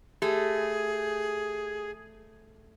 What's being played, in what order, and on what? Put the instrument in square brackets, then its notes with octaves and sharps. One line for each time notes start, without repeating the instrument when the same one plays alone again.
[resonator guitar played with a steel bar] A3 [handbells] G4 [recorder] G#4